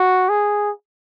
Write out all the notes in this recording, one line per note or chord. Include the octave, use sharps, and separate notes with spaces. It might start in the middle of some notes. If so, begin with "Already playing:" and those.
Already playing: F#4
G#4